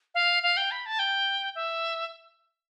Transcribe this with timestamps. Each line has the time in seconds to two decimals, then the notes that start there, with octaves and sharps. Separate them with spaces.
0.15 F5
0.43 F5
0.57 G5
0.71 B5
0.86 A5
0.99 G5
1.55 E5